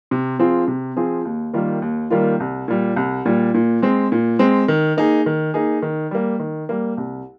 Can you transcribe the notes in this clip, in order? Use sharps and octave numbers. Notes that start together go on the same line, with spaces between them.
C3
F3 C4 F4 G#4
C3
F3 C4 F4 G#4
D#2
D#3 G3 A#3 F4
D#2
D#3 G3 A#3 F4
C2
A#2 G3
C2
A#2 G3
A#2
G#3 C4
A#2
G#3 C4
D#3
A#3 D#4 G#4
D#3
A#3 D#4 G#4
D#3
G3 A#3
D#3
G3 A#3
C2